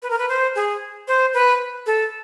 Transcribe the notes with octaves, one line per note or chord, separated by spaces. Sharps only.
B4
A#4
B4
C5
G#4
C5
B4
A4